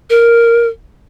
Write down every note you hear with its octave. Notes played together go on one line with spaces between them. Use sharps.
A#4